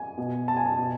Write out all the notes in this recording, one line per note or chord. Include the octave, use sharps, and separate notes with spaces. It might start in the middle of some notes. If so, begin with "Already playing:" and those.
Already playing: G#5
B2
A5
G#5
A5
B2